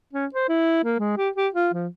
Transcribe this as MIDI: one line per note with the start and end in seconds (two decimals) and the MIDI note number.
0.13 0.26 61
0.35 0.48 72
0.49 0.84 64
0.84 0.98 58
0.99 1.15 56
1.17 1.30 67
1.36 1.48 67
1.55 1.70 65
1.74 1.88 53